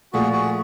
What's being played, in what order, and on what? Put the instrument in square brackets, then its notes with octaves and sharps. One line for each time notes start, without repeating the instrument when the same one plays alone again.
[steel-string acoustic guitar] A#2 F3 A3 [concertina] F#4 G#4
[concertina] F#4 G#4